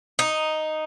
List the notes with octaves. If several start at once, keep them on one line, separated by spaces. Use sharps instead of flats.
D#4